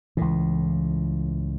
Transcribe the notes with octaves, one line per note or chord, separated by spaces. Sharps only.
C#2 A2 E3